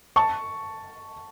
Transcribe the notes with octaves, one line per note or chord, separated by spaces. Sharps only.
A5 C#6